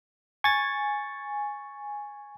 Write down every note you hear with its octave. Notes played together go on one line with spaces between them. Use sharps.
G#5 C#6 A6